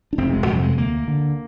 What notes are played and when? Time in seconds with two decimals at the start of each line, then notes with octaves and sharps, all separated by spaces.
0.13 D4
0.18 F1 C4
0.33 G#3
0.47 F2 C3 G3
0.62 G#3
0.77 D2 A#3
1.08 D3